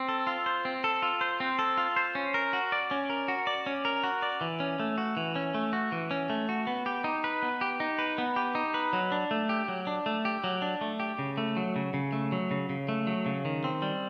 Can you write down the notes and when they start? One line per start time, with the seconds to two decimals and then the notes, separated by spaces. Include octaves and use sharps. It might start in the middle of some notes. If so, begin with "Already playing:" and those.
Already playing: C4
0.09 A4
0.27 F4
0.46 C5
0.65 C4
0.84 A4
1.02 F4
1.21 C5
1.40 C4
1.59 A4
1.78 F4
1.96 C5
2.15 C#4
2.34 A#4
2.53 F#4
2.72 D5
2.91 C#4
3.10 A#4
3.28 F#4
3.47 D5
3.66 C#4
3.85 A#4
4.04 F#4
4.22 D5
4.41 E3
4.60 C#4
4.80 A3
4.98 F#4
5.17 E3
5.36 C#4
5.54 A3
5.73 F#4
5.92 E3
6.11 C#4
6.30 A3
6.49 F#4
6.67 B3
6.86 G4
7.04 D#4
7.24 B4
7.43 B3
7.61 G4
7.80 D#4
7.99 B4
8.18 B3
8.36 G4
8.55 D#4
8.74 B4
8.93 F#3
9.12 D4
9.31 A3
9.49 G4
9.68 F#3
9.87 D4
10.06 A3
10.25 G4
10.44 F#3
10.62 D4
10.81 A3
11.00 G4
11.19 C#3
11.38 A3
11.57 F#3
11.76 C#3
11.94 C#3
12.12 A3
12.32 F#3
12.51 C#3
12.69 C#3
12.89 A3
13.07 F#3
13.26 C#3
13.45 D#3
13.64 C4
13.82 G3